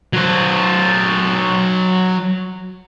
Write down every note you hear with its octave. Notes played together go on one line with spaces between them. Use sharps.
F#3 C5